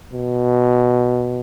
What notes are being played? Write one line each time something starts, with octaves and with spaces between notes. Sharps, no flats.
B2